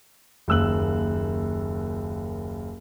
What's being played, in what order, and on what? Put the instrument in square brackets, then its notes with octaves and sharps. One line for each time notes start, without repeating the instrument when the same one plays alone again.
[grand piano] F#1 D#2 E6 F#6 F#7